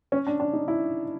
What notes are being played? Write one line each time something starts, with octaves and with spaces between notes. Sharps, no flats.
C#4
D4
D4
D#4
E4